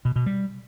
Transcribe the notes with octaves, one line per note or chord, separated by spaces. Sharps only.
B2
B2
G3